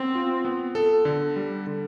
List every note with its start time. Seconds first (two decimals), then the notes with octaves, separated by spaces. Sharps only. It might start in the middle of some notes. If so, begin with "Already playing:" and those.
Already playing: B3 C4
0.15 F4
0.45 B3
0.75 A4
1.05 D3
1.36 G3
1.67 D3